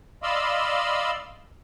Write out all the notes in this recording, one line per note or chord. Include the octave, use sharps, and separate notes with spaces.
D5 D#5 F5 B5 C6 E6